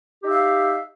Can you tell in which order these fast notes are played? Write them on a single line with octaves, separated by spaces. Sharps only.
G4 D#4 E5 F5